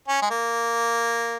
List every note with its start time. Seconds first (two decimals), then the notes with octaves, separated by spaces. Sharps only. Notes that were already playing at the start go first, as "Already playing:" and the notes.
0.08 C#4
0.22 G#3
0.30 A#3